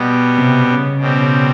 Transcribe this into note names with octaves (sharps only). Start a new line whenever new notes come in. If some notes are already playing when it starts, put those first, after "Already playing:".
Already playing: B2 G3 B3
C3
C#3
B2 G3 C4